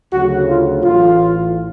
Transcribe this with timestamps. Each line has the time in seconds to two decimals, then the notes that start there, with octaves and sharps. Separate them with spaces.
0.12 D2 C#3 F#3 A3 F#4
0.48 F4
0.84 A1 A2 E3 F4